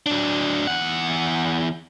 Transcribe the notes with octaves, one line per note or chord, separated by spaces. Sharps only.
F#3 D4
E2 F#5